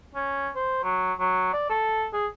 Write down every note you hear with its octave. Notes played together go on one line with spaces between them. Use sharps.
C#4
C5
F#3
F#3
D5
A4
G#4